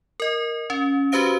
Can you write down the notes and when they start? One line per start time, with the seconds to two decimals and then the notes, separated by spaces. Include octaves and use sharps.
0.20 A#4 D#5
0.70 C#4
1.12 F#4 G4 B4 C5 F5 D7